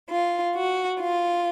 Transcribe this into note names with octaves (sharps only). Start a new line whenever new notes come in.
F4
F#4
F4